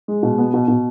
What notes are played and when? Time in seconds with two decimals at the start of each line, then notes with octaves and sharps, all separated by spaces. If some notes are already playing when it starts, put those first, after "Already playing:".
0.08 G#3
0.23 B2
0.38 B3
0.54 B2
0.68 B2